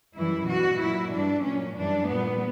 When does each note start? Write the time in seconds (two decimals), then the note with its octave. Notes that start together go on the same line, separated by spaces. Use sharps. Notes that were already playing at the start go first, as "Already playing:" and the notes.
0.16 F#2 E3 G3 E4
0.48 B2 G3 F#4
0.80 A#2 F#3 E4
1.12 G2 E3 G3 D4
1.44 A#2 F#3 C#4
1.77 F#2 E3 G3 D4
2.08 A#2 G3 B3